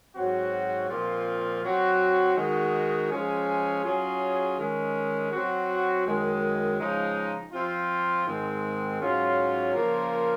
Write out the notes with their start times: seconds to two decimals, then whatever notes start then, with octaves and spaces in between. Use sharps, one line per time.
0.15 G#2 F#3 C4 F#4
0.89 A#2 F3 C4 F4
1.63 F#3 C4 F#4
2.36 D#3 G#3 D#4 F#4
3.10 F3 G#3 C#4 G#4
3.84 F#3 C#4 F4 G#4
4.57 D#3 G#3 C#4
5.31 F#3 C4 F#4
6.05 F#2 D#3 G#3
6.78 C#3 F3 G#3 D#4
7.52 F3 C4 F4
8.26 G#2 D#3 G#3 C4
9.00 G#2 F#3 C#4 F4
9.73 C#3 F3 A#3 F4 A#4